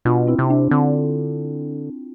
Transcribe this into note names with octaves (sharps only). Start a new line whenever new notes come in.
B2 D4 F4
C4 E4
C3
D4
D3 C4